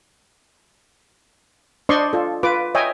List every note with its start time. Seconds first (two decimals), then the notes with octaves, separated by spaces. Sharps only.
1.89 D4 C5 D5 D#5 C6 C#6
2.13 F4 A4
2.43 F4 B4 D6
2.75 C#5 D#5 E5 G5 G#5